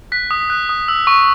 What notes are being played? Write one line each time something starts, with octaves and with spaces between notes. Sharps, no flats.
F#6 B6
D#6
F#6
D#6
E6
C#6